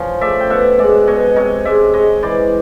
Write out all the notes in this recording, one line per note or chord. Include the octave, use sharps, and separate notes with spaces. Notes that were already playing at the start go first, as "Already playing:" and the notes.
Already playing: F3 C#4
A3 D5 E5
G5
B2 E5 F#5
G#3 D5 E5
B2 C#5 D#5
C3 C#5 D#5
G#3 D5 E5
G#3 C#5 D#5
E3 C5 D5